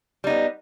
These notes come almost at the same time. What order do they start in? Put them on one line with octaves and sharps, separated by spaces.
G3 D#4 B3